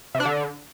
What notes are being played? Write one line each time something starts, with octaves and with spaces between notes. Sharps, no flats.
C3
D4
D3